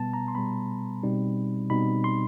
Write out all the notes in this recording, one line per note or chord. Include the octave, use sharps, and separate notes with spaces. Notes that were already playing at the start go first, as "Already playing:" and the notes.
Already playing: B2 G3 B3 A5
A#5
C6
B2 G3 B3 B5
B2 G3 C4 D#4
B2 G3 C4 D#4 B5
C6